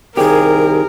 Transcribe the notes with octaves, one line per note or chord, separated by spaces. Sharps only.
C2 D#3 G4 G#4 A#4